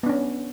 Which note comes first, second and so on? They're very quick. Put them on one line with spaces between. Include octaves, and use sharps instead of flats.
B3 D4 C#4